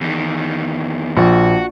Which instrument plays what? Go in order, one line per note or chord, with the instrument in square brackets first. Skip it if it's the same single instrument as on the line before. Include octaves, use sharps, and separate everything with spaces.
[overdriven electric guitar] E2 D#3
[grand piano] A#1 [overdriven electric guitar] F#4